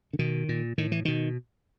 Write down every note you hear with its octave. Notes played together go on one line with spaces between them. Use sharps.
D3
B2 D#3
A#2
A2 D#3
E3
B2 D#3